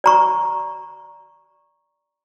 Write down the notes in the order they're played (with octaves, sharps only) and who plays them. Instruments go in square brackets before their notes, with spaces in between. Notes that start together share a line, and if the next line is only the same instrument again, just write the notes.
[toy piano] D5 A#5 C#6